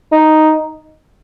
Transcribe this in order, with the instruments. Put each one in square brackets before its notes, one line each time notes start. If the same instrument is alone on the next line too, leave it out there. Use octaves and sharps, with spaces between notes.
[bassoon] D#4